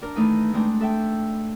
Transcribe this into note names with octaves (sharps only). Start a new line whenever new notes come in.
D4 A#4
D#3 E3 A3 D#4
G#3 A3 C4 D4
A4 E5 G5